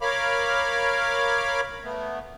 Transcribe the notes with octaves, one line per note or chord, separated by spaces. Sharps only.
A#4 C#5 F5 B5 D6 F6
A3 B3